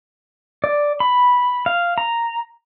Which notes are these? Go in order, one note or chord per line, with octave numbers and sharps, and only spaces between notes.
D5
B5
F5
A#5